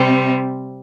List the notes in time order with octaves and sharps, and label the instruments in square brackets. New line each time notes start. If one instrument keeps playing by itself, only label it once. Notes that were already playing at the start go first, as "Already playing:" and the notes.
Already playing: [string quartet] C3 G3 C4